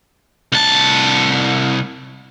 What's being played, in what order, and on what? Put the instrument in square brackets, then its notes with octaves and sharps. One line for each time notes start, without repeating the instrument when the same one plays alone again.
[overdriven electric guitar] C2 A5